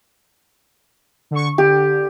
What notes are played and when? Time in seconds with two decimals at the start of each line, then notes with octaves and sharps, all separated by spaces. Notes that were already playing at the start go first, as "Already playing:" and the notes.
1.31 D3 C#6
1.58 D3 G4